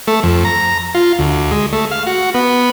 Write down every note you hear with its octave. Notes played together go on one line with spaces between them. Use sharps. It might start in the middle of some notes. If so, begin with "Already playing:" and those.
A3
F2
A#5
F4
D2
G#3
A3
F5
F#4
B3